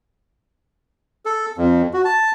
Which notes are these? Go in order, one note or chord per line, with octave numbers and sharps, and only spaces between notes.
A4
F2
F#4
A5